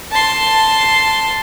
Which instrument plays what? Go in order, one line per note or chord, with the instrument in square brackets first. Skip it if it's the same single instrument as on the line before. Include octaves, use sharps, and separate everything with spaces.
[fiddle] A5 C6